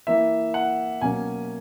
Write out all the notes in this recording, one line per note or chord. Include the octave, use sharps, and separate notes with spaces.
E3 A#3 E4 E5
F#5
B2 F#3 A#3 C#4 G#5